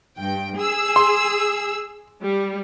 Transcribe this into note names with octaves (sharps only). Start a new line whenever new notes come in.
G2 G5
G#4 E6
C6
G3